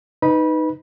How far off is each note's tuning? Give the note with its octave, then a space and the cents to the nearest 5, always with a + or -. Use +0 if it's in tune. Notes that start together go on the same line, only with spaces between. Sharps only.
D#4 +0 B4 +10 B5 -25